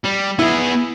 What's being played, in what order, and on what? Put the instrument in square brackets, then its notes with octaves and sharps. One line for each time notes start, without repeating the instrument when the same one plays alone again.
[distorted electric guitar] G3
[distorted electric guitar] B3 G#4 [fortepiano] E4